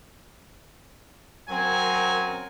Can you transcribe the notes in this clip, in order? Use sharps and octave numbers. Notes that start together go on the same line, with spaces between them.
F#2 F#3 C4 A#4 G#5